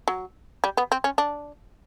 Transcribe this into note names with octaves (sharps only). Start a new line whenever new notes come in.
F#3
G3
B3
C4
C#4
D4